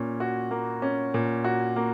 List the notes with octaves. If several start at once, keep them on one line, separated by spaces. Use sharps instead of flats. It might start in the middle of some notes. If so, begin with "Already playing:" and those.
Already playing: A#2 C#4
F#4
A#3
C#4
A#2
F#4
A#3